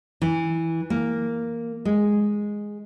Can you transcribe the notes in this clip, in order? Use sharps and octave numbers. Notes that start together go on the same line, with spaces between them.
E3
A#3
G#3